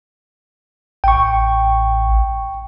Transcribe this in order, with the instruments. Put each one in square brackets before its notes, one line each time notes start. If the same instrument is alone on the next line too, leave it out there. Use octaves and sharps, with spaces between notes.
[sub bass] A1 [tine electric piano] G5 C#6